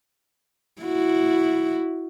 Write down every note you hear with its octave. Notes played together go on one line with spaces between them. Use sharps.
E4 F#4